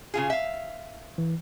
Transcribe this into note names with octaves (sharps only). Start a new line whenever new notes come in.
C#3 F4 G#4
E5 F5
E3